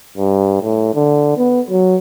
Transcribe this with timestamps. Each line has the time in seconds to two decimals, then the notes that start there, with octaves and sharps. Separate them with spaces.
0.18 G2
0.62 A2
0.94 D3
1.37 B3
1.70 F#3